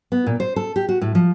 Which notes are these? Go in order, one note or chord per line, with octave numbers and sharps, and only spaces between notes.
B3
A#2
C5
A4
G4
F#4
A2
F3